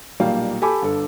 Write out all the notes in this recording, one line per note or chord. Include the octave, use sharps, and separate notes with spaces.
B1 A#2 G3 A#3 F5 G5
G4 A4 G#5 A5 B5 D6
G1 A4